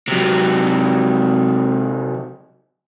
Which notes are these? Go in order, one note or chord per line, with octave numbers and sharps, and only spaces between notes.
C3 F#3